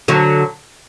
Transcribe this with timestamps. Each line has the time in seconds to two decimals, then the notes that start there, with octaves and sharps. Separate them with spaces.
0.08 D3 F#3